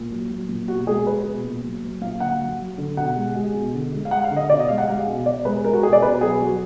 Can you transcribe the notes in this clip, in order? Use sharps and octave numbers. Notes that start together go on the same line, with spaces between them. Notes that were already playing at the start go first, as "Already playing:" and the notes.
Already playing: A#2
F#3
F#3
A#2
B2 F#4
G#3 G#4
G#3 B4
B2
A#2
F#3
F#3
A#2 F5
D3 F#5
F#3
F#3
D3
B2 F#5
G#3
G#3
B2
D3
G#3
F5
G#3 F#5
F5
D3
D#5
B2 D5
D#5
G#3 F5
F#5
G#3 F5
B2
B2 D5
G#3 B4
G#3 A#4
F#4
B2 G#4
D5
B2 B4
F#3 G#4
F#3 F#4